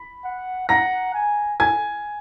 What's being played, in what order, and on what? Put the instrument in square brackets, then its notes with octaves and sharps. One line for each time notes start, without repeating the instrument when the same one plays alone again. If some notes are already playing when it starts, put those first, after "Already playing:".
Already playing: [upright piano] B5
[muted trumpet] F#5
[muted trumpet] F#5 [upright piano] A#5 A#6
[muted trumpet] G#5
[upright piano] G#5 G#6